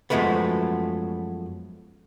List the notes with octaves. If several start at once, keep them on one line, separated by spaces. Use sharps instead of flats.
F#2 F3 F#3 G#3 A3 B3